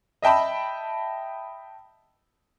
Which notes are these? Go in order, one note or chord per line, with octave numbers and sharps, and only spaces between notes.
D#5 E5 G5 A5 B5